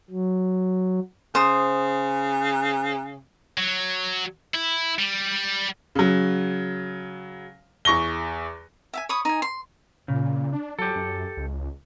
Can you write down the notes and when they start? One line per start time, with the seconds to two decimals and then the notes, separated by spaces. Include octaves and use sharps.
0.10 F#3
1.35 C#3 C5 D#6
3.58 F#3
4.54 E4
4.99 G3
5.95 C#3 F#3
7.85 E2 C#6 A#6 G7
8.93 E5 F5 G#5
9.09 C#5 B5 C#6 D#6
9.25 D#4 G#5
9.42 C6
10.08 A#2 C#3
10.53 D4
10.79 F#3 G4 A4
10.96 F#2
11.37 C#2